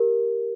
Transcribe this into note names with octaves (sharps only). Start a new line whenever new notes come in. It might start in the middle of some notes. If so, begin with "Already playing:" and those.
Already playing: G4 A#4